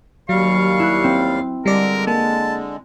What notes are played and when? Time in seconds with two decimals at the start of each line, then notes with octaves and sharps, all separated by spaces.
0.29 D#2 F#3 G3 F5 C#6
0.80 E4 F#6
1.04 C4
1.66 D3 G3 G#3 A#4 D5
2.07 A#3 A5